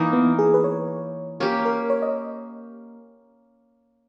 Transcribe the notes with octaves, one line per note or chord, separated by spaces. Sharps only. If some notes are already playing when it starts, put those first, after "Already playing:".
Already playing: E3 A#3 D#4
B3
G#4
B4
C#5
A#3 C#4 G4
A#4
C#5
D#5